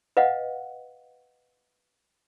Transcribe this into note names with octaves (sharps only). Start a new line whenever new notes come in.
B4 D#5 F5 F#5